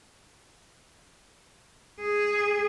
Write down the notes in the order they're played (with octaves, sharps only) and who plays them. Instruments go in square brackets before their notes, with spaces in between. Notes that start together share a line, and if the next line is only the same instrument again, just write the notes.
[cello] G#4